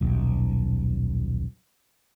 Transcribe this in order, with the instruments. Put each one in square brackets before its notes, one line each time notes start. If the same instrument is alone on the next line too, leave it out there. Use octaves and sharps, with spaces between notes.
[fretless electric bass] D#1 B1